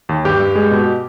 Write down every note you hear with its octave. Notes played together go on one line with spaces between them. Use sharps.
D#2
G2 G4
G2
G#3
B2